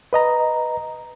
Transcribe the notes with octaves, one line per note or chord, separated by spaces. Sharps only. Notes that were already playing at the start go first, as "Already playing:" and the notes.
B4 D#5 A#5